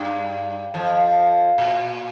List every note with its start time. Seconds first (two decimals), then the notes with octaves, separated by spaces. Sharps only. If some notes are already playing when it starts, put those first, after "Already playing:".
Already playing: G2 G3
0.74 F2 F3
1.58 A#2